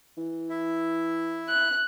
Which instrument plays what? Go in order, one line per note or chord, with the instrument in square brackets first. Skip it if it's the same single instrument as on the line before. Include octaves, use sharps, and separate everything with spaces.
[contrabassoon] E3
[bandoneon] E4 E5
[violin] F#6